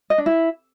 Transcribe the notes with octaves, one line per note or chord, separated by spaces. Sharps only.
D#5
D4
E4